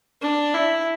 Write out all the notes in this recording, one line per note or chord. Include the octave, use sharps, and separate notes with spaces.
D4
E4